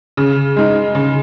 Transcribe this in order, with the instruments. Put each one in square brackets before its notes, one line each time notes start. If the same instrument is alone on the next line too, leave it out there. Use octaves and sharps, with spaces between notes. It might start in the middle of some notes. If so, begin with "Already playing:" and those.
[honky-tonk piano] C#3
G#3 D#4
C#3